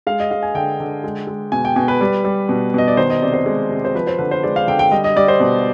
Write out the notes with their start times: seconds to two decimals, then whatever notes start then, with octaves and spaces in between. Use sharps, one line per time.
0.07 G#3 F5
0.20 D#5
0.31 G#3 F5
0.43 G#5
0.55 D3 G5
0.80 D3
1.04 G#3
1.27 G#3
1.52 B2 G#5
1.65 G5
1.76 B2 G#5
1.88 B4
2.01 G3
2.24 G3
2.49 B2
2.74 B2 D#5
2.88 D5
2.97 D#3 C5
3.10 D#5
3.22 C3 D5
3.34 C5
3.46 G#3
3.70 C3
3.85 C5
3.95 F3 B4
4.07 C5
4.19 D3 B4
4.31 C5
4.43 G#3 D5
4.56 F5
4.67 D3 G5
4.79 G5
4.91 G3 D#5
5.04 D#5
5.16 G3 D5
5.28 C5
5.40 B2